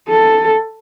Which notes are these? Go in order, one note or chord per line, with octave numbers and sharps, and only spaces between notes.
A4